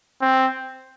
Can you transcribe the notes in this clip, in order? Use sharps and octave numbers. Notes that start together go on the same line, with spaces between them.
C4